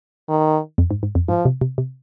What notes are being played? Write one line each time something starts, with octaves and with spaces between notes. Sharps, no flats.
D#3
F2
G#2
G#2
F2
G#2 F3
C3
C3
C3